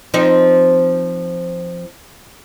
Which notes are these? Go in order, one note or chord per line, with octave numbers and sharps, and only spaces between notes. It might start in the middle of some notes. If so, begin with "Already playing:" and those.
F3 C4 D#4